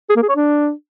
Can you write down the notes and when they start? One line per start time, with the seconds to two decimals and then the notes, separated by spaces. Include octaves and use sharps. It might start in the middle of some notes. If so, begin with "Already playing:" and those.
0.10 G#4
0.16 A#3
0.23 G#4
0.29 C#5
0.36 D4